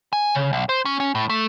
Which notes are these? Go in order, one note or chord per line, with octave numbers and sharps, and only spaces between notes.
G#5
C#3
B1
C5
C#4
C#4
A2
A3